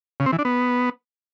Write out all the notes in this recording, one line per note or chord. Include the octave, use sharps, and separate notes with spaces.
C#3
C4
E3
D4
B3